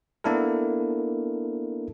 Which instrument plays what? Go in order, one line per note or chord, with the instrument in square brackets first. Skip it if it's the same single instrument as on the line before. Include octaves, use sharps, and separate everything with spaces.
[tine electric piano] A#3 B3 D4 E4 A4 A#4